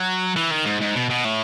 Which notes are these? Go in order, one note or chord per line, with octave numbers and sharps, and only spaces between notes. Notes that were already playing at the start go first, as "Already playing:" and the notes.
Already playing: F#3
E3
D#3
G#2
G#2
B2
B2
A2